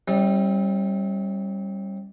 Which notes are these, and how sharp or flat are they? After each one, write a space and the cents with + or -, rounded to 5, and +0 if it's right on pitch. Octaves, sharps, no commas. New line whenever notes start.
G3 +0 C#4 -40 E4 -35